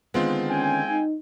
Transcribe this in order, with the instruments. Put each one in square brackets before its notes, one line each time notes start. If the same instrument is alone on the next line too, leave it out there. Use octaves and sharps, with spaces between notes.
[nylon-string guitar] D3 D#3 B3 [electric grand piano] G#3 C4 F4
[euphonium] C#4 [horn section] G5 G#5
[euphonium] D#4